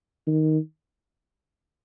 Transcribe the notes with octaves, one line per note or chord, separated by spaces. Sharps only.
D#3